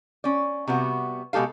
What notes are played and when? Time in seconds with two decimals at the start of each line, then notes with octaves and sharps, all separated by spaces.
0.24 C#4 D5
0.68 C3 G3 B3 F#4
1.33 B2 G#3 G4 A4 F5